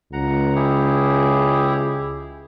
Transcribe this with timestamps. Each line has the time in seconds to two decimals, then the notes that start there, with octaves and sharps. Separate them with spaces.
0.13 C#2 F#5 A#5
0.55 E4 G4 G#4